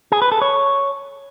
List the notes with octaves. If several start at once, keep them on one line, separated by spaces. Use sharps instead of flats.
G#4
B4
A4
C#5